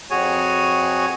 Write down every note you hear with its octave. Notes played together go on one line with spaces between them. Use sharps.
F2 F#4 G#4 C#5 G#5